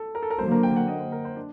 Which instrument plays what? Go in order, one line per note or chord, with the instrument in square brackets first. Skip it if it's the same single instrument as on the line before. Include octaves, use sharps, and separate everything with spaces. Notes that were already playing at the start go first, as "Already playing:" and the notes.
Already playing: [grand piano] A4
A#4
A4
A#4
[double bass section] D3 F#3 A#3 [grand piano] C5
[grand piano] A#4
G5
F#5
D#5
C5
A#4
C5
D4